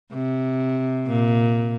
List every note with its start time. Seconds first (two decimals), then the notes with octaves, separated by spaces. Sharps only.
0.13 C3
1.07 A#2